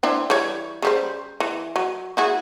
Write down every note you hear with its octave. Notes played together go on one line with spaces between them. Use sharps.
C4 D4 E4
E3 G3 C#5
C#3 G3 C5
E3
F#3
E4 F#4 G#4